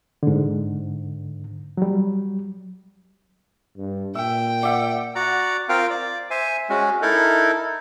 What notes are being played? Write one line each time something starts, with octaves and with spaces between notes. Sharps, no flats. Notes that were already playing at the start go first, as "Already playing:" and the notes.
G#2 D3
F#3 G3
G2
A#2 E5 G5
D5 E5 F#5
F#4 D5 F#5 A#5
C4 F4 A#4 F5 G5
D5
C5 E5 G#5
G#3 C#4 F#4
D#4 E4 A4 A#4